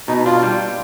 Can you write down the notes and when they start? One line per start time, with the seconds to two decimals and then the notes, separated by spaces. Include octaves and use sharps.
0.08 B2 D#4
0.25 D4 F4
0.43 G3